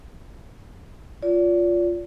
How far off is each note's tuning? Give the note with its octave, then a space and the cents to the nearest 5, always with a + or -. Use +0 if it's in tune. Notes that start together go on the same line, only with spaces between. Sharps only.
F4 +0 D5 -30